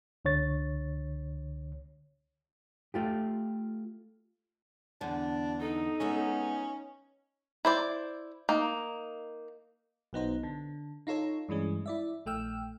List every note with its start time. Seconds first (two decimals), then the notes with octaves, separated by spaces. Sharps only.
0.25 C#2 D3 C#5 A6
2.94 A3 F4 G4
5.01 E2 D3 D4
5.60 D#4 A4
6.00 G#3 B3 C#4 E5
7.65 E4 C5 D5
8.49 A#3 D#4
10.13 B1 B3 D#4 C5
10.43 D3
11.07 D#4 F4 A4 C#5
11.49 G2 E3 G#3 C#4
11.86 E4 D5 E5
12.26 A#1 A3 G5 E6 F6